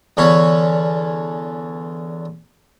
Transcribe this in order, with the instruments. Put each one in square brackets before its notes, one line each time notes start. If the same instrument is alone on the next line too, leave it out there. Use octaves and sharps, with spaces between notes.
[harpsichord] E2 D3 C#4 C#5 B5